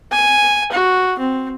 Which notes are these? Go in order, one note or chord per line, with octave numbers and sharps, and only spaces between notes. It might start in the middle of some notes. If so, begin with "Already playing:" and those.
G#5
F#4
C4